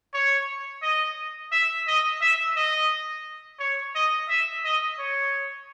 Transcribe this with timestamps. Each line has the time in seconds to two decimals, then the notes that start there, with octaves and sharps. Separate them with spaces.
0.14 C#5
0.82 D#5
1.52 E5
1.87 D#5
2.21 E5
2.56 D#5
3.59 C#5
3.95 D#5
4.29 E5
4.64 D#5
4.99 C#5